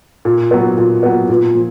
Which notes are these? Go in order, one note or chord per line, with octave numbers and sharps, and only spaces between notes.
A#2
F#3 B3
A#2
F#3 B3
A#2
F3